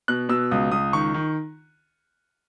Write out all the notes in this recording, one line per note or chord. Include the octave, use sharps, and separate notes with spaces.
B2 F#6
B2 E6
C#2 D#6
C#2 D#6
D#3 C#6
D#3